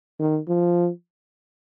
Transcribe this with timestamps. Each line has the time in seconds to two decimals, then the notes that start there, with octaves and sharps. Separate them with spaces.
0.20 D#3
0.48 F3